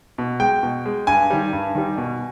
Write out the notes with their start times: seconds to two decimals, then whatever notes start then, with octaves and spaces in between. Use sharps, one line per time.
0.18 B2
0.40 G#3 G5
0.63 B2
0.86 G#3
1.07 G2 G#5
1.30 D#3 G3
1.53 G2
1.75 D#3 G3
1.98 B2